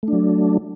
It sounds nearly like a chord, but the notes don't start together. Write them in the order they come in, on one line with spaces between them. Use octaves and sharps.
A3 D4 F#3